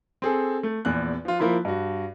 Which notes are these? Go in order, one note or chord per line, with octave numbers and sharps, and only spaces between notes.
C4 G#4 A4
A3
A#1 E2 F#6
F3 F4
F3 A#3 E4 B5 C6
G2 F#4